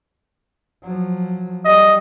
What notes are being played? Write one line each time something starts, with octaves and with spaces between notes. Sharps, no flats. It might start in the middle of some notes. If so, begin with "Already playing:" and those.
F3 F#3
G3 D#5